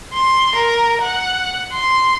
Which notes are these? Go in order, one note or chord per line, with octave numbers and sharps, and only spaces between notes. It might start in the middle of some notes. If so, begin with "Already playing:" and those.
C6
A#4
F#5
C6